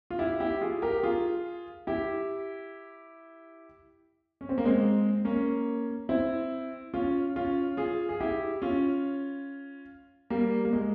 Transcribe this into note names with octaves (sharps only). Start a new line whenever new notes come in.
F4
E4 G4
E4 G4
F4 G#4
G4 A#4
F4 G#4
E4 G4
C#4
C4
A#3
G#3 C4
A#3 C#4
C4 E4
C#4 F4
C#4 F4
F4 G#4
G#4
E4 G4
C#4 F4
G3 A#3
A#3
G#3